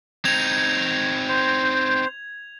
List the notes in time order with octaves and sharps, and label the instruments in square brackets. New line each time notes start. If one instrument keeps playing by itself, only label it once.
[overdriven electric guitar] C4 D#4 [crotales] G#6 F7
[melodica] C5